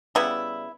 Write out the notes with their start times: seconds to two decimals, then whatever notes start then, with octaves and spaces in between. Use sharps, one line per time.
0.15 C#3 G3 B3 E4